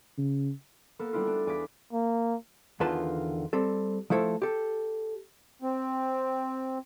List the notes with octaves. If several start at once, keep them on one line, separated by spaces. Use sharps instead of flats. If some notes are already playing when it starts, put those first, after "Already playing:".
C#3
A#3 B3 A4
G3 A3 B3 D4 E4 F4
D4
E2 G#4 D5 F5 D6 B6
A#3
E2 D3 D#3 F4 B4 A5
G3 C4 A4
F3 A3 E4 A4 C5
G4 A4
C4